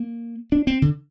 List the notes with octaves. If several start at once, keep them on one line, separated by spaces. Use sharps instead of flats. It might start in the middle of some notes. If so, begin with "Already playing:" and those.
Already playing: A#3
D4
C4
D3